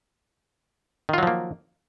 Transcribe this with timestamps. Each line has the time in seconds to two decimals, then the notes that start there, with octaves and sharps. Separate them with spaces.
1.09 D#3
1.13 F4
1.18 F#3
1.23 F3
1.27 A#3